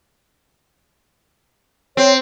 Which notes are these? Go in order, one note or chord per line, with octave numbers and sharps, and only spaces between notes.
C4 C#5